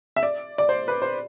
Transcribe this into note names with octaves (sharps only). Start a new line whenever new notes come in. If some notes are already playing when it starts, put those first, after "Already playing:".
E5
D5
D5
C5
B4
C5